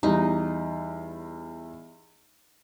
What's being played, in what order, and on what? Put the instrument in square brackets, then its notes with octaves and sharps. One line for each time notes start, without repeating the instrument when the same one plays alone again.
[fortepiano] E2 G3 [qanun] D#4